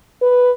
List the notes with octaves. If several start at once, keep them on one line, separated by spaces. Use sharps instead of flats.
B4